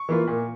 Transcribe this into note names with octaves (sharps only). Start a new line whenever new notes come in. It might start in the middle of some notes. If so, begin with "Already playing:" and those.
Already playing: C#6
E3 A#3 F4
A#2